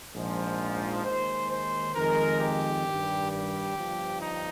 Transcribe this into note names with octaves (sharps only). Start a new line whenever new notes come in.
A#1 G#2 F3
D#2 D#3 G#3 C5
C5
F2 D#3 G#3 A#4
G4
G2 D#3 G3
G4
G1 G2 F3
D#4